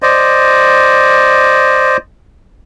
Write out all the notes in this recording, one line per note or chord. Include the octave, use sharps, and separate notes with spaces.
C5 D5 D#5